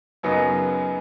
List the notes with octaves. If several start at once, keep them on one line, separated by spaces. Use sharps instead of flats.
F#2 C#3 F#3 B3 D#4